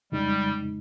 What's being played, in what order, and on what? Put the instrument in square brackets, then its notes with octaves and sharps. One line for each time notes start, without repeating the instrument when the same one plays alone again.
[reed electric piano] F2 C#3 G#3 D#4 [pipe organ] G3